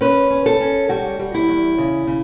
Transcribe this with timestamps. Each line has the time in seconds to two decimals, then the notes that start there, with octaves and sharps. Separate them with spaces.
0.01 C#4 B4
0.30 C#4
0.46 A4
0.60 C#4
0.89 G3 F#4
1.19 G3
1.34 E4
1.48 E2
1.78 C#3
2.07 C#3